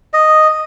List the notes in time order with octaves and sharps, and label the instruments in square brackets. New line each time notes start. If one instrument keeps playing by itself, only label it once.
[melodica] D#5